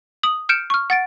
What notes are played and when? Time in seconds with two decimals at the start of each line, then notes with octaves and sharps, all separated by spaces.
0.23 D#6 F#7
0.49 F6 G6 C#7 D7 E7
0.70 C#6 F6
0.90 F#5 A6 D7